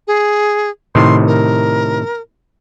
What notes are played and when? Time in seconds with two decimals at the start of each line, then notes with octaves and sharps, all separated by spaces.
0.08 G#4
0.95 A2 C3 D#3 C6
1.27 A#4